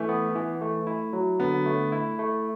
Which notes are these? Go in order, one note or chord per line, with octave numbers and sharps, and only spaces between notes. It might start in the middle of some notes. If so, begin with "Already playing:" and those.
Already playing: E3 A3
B3
E3
A3
E4
F#3
D3 B3
A3
E4
A3